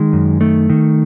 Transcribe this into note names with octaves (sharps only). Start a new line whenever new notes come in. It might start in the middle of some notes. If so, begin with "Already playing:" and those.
Already playing: D#3 G#3
F#2
D#3 A3
D#3